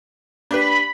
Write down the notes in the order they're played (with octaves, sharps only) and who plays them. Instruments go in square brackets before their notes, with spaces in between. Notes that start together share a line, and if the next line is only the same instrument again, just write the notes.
[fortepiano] D4 G4 B4 [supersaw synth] B5